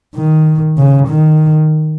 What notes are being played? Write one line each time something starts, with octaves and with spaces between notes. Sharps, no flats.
D#3
C#3
D#3